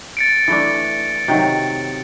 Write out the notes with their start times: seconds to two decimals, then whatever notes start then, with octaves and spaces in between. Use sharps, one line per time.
0.17 A6 C#7 D7
0.48 E3 A3 D4
1.28 C3 D#3 F#3